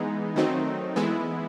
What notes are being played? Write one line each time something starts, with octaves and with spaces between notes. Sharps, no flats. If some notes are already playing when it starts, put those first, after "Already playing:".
Already playing: E3 G#3 B3 D#4
D#3 F#3 A3 C4 D#4
E3 G#3 B3 E4